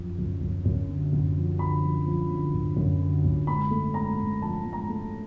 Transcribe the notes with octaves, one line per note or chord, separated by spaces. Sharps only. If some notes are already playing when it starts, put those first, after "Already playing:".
Already playing: F#2 F3
F#2
F#2
F#2
D3
F#2
F3
D3 B5
F3
F3
D3
F#2
F#2
D3
F#2
G#2 B5
A3
G#2 A#5
G#2
F3 A5
G#2
A#5
A3